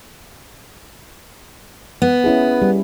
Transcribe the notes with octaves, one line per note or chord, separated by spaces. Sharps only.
B3
C#4 E4 G#4
G3